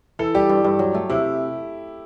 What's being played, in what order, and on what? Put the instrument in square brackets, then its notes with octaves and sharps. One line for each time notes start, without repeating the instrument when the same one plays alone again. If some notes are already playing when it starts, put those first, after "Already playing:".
[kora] E3 [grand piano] A4
[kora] G3 [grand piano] G4
[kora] G2
G2
F#3
A3
[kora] C3 [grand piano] E4